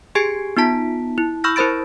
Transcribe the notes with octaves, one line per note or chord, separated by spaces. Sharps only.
G4 G#4 G#5 G#6 C7 D7
B3 D#4 F4 A5 B6
E4
B5 C#6 E6 F6 G6 A#6
E4 A#4 C5 B5 A6 D7